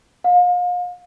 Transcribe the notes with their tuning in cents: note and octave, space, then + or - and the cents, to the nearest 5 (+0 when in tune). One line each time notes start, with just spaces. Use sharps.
F5 +35